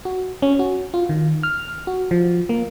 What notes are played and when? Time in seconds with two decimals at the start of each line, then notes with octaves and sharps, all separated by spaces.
0.05 F#4
0.42 C#4
0.59 F#4
0.94 F4
1.09 D#3
1.43 F6
1.87 F#4
2.11 F3
2.49 A#3